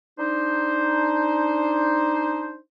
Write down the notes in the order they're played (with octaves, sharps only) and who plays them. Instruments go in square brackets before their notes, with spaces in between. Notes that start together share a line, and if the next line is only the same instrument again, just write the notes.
[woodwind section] D4 D#4 C5